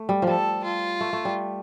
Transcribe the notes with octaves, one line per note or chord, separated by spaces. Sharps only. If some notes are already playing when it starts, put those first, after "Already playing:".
Already playing: A3
G3
F3 G3 A4
F4
A3
A3
G3